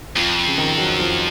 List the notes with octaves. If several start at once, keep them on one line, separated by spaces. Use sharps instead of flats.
F2 F3
C#3
D#3
F#3
F3